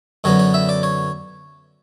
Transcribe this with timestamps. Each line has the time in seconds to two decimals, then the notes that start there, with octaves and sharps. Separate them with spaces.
0.24 F#2 D3 F#3 B3 C#5
0.39 C#5
0.54 E5
0.69 D5
0.83 C#5